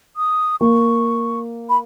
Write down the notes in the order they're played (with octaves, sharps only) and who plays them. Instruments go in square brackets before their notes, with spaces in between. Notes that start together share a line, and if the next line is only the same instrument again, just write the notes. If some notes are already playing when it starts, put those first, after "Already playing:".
[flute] D#6
[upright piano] A#3 [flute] C#6
[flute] B5